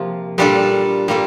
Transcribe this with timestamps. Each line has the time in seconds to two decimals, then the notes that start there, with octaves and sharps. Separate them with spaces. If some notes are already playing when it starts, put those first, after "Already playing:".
Already playing: C3 F3 A#3 F4
0.38 A#2 G3 D4 F4 A4
1.08 G3 A#3 F4 A4